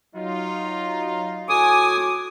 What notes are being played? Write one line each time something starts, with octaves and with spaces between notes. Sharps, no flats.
F#3 D#4 F4
A2 F#4 G#5 D6 D#6